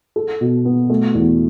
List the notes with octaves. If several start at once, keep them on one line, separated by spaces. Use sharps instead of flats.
A4
B2
B3
A3
E2